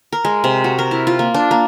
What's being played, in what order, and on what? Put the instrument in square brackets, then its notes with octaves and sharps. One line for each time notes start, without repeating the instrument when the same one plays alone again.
[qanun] A#4
G#3
C3
F#4
A#4
E4
F4
A#3
D4
A#3